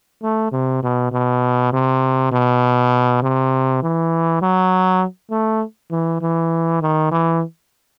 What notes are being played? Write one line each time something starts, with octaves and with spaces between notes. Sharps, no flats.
A3
C3
B2
B2
C3
B2
C3
E3
F#3
A3
E3
E3
D#3
E3